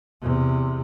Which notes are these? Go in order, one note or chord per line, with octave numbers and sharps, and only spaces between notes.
E2 C3